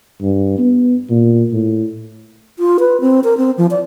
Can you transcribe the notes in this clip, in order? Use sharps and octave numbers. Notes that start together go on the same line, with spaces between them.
G2
B3
A#2
A2
F4
B4
C4
A#4
C4
F3
D5